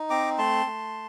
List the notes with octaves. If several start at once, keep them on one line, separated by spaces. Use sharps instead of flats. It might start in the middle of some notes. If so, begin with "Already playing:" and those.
Already playing: D#4
C4 A#5 D6
A3 A5 C6
A3